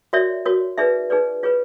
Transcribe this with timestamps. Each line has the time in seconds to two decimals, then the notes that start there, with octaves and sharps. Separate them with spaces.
0.13 F#4 A#4 C#5 D5 E5
0.46 F#4 A#4 C#5
0.78 D#4 G#4 B4 D5 E5
1.10 D#4 G#4 B4 D5
1.43 F4 G#4 B4 C#5